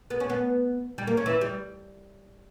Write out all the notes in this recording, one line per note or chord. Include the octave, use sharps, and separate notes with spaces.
B3
C#4
B3
G3
A#3
C#4
E3
G3